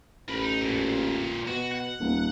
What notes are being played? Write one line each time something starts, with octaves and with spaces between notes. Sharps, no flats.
A1 A#4 B5
D#4
F2 A#2
B2 F#4
F#5
D#1